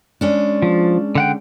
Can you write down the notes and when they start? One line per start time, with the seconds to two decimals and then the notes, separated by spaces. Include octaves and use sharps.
0.21 G#3 C#4 D4
0.62 F3
1.15 D3 F#5 G5